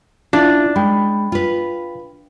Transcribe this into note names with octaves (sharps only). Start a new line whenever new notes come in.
D4 E4 F4
G#3 G5 B5
F4 B4